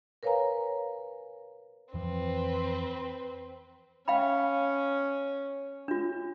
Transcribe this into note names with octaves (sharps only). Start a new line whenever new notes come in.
A#4 B4 C#5 F5 G#5 A#5
F2 E3 F3 C4 B4
C#4 F5 G5 B5
D4 F4